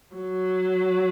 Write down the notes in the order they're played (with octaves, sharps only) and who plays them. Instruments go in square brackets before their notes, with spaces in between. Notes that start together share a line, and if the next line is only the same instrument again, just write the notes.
[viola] F#3